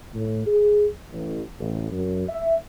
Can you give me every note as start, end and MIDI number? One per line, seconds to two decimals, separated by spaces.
0.14 0.46 45
0.46 0.86 68
1.11 1.41 33
1.60 1.90 33
1.92 2.28 42
2.29 2.55 76